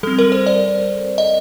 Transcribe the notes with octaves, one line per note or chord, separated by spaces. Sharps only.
G3 C4 A4
A#4
C5
D5
D#5